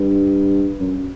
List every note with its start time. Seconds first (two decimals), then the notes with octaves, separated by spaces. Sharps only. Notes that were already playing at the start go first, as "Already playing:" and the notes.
Already playing: G2
0.80 F#2